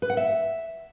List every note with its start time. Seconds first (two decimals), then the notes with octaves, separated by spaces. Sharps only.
0.02 B4
0.10 F#5
0.17 E5